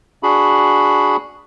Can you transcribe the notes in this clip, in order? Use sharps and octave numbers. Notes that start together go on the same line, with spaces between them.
D4 F#4 G#4 B5